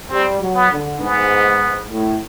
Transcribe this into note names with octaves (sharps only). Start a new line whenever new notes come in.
G3 C4
F#3
B3
D3
G#2 B3
A2